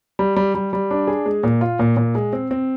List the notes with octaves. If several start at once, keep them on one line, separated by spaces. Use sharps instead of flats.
G3
G3
G3
G3
D4
G#4
G#3
A#2
F4
A#2
A#2
G#3
C4
C4